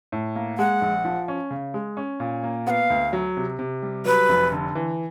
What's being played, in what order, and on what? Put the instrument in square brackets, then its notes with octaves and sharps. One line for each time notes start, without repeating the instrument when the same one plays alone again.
[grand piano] A2
A#3
[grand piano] G#3 [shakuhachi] F#5
[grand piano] A#1
F3
C#4
C#3
G#3
C#4
A#2
A#3
[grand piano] B3 [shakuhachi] F5 F#5
[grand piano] D2
F#3
C3
C3
G3
[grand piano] F#3 [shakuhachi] B4
[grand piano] F1
D3
E3